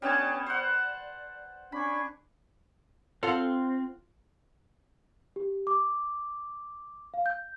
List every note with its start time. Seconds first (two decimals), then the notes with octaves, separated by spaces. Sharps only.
0.02 G3 B3 C#4 D4 C#5 A5
0.46 C5 D5 F#5
1.72 C#4 D4 B5 C#6
3.23 C4 F4 A4 F5 F#5
5.36 G4
5.67 D6
7.14 F5
7.26 G6